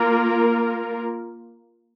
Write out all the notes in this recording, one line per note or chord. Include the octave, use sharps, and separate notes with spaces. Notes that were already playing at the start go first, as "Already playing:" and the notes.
Already playing: A#3 F4 A#4